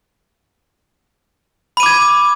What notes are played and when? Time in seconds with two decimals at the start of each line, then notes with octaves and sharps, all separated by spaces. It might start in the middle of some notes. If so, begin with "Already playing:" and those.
1.77 B5
1.80 D#7
1.83 D6
1.86 G#6